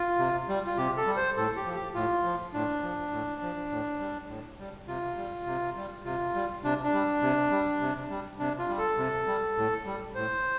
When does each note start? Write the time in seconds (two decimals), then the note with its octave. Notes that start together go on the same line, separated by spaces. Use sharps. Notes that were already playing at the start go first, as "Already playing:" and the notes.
Already playing: F4
0.19 C3
0.49 G3
0.67 F4
0.77 C3 G4
0.97 A4
1.07 G3
1.17 C5
1.36 A2 A4
1.56 G4
1.65 F3
1.75 G4
1.94 A2 F4
2.24 F3
2.54 A2 D4
2.83 F3
3.12 A2
3.42 F3
3.71 A2
4.00 G3
4.29 A2
4.59 G3
4.88 C3 F4
5.17 G3
5.46 C3
5.76 G3
6.05 C3 F4
6.35 G3
6.64 C3 D4
6.84 D4
6.93 G3
7.22 C3
7.51 G3
7.81 C3
8.10 G3
8.39 C3 D4
8.59 F4
8.69 G3
8.78 A4
8.98 C3
9.27 G3
9.57 A2
9.86 G3
10.15 A2 C5